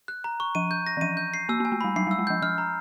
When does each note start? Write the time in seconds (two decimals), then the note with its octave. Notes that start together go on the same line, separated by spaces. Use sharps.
0.08 F#6
0.24 A#5
0.40 C#6
0.55 F3 D#7
0.71 G6
0.87 A#6
0.97 E3
1.01 F3 D#7
1.17 G6
1.34 C7
1.49 A#3 E6
1.60 A#3
1.65 G#5
1.72 A3
1.81 G3 B5
1.96 F#3 C7
2.07 G3
2.11 E6
2.19 G#3
2.27 F3 G6
2.42 F3 F6
2.58 A#5